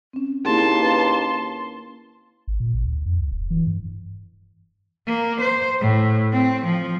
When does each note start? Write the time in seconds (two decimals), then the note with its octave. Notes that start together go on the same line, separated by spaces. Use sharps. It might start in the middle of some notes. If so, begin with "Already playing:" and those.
0.13 C4 C#4
0.45 D#2 A#3 E4 G#4 A5 C6
0.81 C#4 B4 F5
2.48 G#1
2.60 A#2
2.74 A1
2.86 D2
3.06 F2
3.19 C#2
3.31 D#1
3.50 E3
3.67 G2
5.07 A#3
5.41 C5
5.81 A2
6.33 C4
6.65 F3